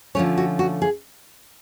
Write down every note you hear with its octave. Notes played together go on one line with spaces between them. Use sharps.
D3 F3 A3 C#4 C#5
F#4
F#4
G#4